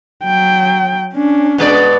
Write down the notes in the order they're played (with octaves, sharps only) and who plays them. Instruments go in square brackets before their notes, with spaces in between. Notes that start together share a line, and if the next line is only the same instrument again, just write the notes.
[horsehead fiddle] F#3 G5
C#4 D4
[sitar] B2 G#3 D5